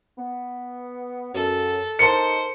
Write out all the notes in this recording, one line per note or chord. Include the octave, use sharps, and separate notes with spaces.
B3
F#2 A4
D#4 A#4 C5 A5 C#7